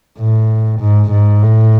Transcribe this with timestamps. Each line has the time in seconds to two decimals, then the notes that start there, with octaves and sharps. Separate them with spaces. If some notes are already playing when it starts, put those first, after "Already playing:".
0.19 A2
0.81 G#2
1.12 G#2
1.43 A2